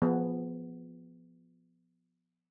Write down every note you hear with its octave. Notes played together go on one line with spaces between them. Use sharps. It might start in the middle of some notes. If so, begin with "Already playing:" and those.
F3 B3 G#4